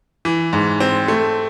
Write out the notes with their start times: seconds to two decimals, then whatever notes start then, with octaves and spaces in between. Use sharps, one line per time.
0.25 E3
0.53 G#2
0.80 C4
1.08 A3